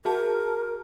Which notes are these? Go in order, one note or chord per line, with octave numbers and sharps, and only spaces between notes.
F#4 G#4 A#4 A5